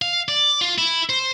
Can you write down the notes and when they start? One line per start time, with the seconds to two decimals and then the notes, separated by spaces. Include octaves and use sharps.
0.02 F5
0.29 D5
0.61 F4
0.78 E4
1.09 C5